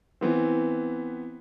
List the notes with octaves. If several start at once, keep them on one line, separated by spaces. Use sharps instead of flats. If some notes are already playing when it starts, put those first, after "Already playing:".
E3 B3 C4